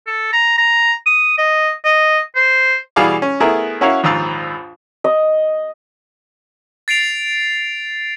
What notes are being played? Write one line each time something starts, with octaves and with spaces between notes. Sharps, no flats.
A4
A#5
A#5
D#6
D#5
D#5
C5
B2 E3 G3 G#4 F5 D6
C#4
A3 B3 E4 G#4 A#4
C#4 E4 F#4 A#4 C#5 F5
A#1 D#2 G#2 F4 E6
D#5
A6 C7 D7 F7